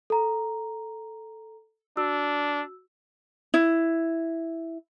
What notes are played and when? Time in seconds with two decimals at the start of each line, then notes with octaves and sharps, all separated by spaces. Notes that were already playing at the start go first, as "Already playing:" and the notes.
0.10 A4 A#5
1.97 D4 F#4 E6
3.54 E4